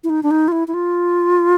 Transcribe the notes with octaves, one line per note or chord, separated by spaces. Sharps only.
E4
D#4
D4
D#4
F4
E4
E4
F4